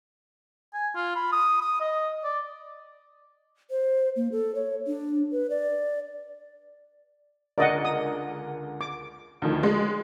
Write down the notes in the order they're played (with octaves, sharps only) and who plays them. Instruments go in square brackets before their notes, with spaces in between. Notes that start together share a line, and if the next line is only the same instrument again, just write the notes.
[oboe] G#5
F4
B5
D#6
D#6
D#5
D5
[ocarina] C5
A#3
A4
C#5
D4
B4
D5
[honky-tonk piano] C#2 D3 A#4 [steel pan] D5 D#5 F#5
[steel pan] D#6
D6
[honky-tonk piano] D2 D#3 F3
G#3